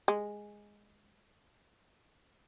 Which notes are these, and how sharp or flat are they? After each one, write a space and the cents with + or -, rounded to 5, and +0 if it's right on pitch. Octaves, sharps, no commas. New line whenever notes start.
G#3 -5